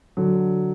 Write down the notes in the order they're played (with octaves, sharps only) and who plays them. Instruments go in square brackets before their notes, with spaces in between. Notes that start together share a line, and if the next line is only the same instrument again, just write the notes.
[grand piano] D3 F#3